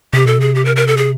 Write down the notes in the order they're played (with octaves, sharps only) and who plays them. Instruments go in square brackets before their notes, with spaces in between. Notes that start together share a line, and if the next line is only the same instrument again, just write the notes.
[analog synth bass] C3 [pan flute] G4
[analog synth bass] B2 [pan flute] A4
[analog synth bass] C3 [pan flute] G#4
[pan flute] G4
A#4
A#4
A4
G#4